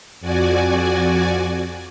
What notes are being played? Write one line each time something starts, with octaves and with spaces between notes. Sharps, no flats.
F2 F#4 D5 G#5